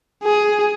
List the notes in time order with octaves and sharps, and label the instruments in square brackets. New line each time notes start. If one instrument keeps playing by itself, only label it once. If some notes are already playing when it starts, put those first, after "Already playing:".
[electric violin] G#4